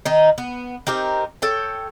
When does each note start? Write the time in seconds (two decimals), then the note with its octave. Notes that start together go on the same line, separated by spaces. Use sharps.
0.05 D#3 D#4
0.38 B3
0.87 C4 D#4 G4 A#4
1.42 A4 C#5 G5